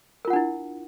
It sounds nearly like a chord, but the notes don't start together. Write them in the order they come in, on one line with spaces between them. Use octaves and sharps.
A#4 F4 F#5 D4 E4